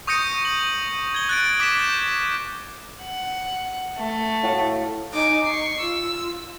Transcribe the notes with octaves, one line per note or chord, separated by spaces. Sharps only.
C#6 D#6 G6 A#6 C#7 D#7
F#7
G#6 G7
F#6 A6 D7
D6 B6 E7
G6
F#5
A3
A2 F#4 F5
D#4 G#5 D6
C#6 C7
F4 E6